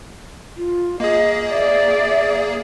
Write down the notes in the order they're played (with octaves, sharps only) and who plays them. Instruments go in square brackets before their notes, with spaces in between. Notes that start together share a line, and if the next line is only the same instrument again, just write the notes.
[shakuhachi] F4
[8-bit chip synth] A#3 G#4 [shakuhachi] D#5
[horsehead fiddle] D5 [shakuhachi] E5